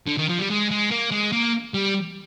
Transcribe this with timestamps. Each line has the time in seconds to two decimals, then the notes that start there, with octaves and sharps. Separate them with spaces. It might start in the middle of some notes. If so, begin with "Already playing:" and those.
0.07 D3
0.17 D#3
0.29 F3
0.39 G3
0.50 G#3
0.71 G#3
0.91 A#3
1.11 G#3
1.32 A#3
1.74 G3